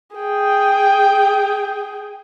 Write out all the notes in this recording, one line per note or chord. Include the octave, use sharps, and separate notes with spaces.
G#4 G5